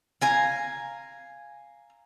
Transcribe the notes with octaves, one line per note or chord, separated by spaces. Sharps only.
F5 G#5 A#5